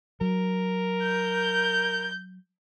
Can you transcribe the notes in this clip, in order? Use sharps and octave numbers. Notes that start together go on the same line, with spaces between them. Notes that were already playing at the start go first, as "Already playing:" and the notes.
F#3 A#4
G6